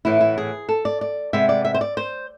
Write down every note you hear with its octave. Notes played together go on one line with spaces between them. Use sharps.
A2 E3 B3 E4
E4
G#4
A4
D5
D5
C3 G#3 B3 E5
D5
E5
C5
D5
C5